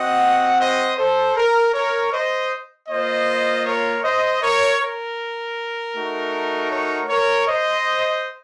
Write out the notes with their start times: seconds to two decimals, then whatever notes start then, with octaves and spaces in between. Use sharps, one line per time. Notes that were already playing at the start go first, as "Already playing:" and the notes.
Already playing: C4 F#4 D#5 F#5
0.60 C5 D#5
0.98 A4 C5
1.36 A#4
1.74 A#4 C#5
2.13 C5 D#5
2.89 A#3 F4 C5 D#5
3.66 A#4 C#5
4.03 C5 D#5
4.41 A#4 C#5
4.81 A#4
5.95 A3 D#4 F#4
6.71 A#4 C#5
7.09 A#4 C#5
7.47 C5 D#5